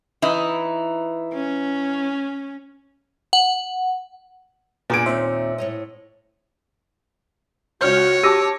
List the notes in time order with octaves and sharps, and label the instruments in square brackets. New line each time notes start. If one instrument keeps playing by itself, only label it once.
[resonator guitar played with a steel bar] E3 D#4 E4
[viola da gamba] C#4
[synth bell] F#5
[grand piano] A#2 D7 [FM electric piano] B3 G#4 G#5 [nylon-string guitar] D4
[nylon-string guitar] D#2 C4 D#4 [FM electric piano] C5 E5
[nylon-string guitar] A2 C#5 D#5
[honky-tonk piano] C#2 F6 G6 [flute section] F#4 [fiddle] C#5
[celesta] G4 E6 D#7 [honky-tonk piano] A5 D6 A#6